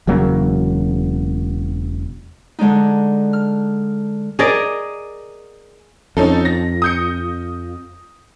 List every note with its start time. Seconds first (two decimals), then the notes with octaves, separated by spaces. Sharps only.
0.07 E1 C#3 F#3 A#3
2.59 D3 G#3 D4 D#4
3.33 F6
4.39 G#4 A#4 D5 D#5
6.17 F2 C#4 D#4 A4
6.45 A#6
6.82 D#6 G6 C#7